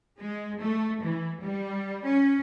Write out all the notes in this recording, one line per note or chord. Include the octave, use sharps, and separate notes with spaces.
G#3
A3
E3
G3
C#4